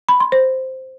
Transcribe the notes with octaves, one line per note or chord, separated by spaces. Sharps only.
B5
C6
C5